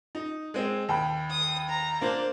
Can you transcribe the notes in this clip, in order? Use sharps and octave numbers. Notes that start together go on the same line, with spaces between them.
D#4
G#3 C4
D#2 G5 B5
D#6
A#5
A#3 D4 C5